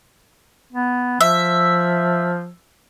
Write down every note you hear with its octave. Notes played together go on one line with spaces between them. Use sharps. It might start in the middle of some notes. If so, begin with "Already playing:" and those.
B3
F3 E5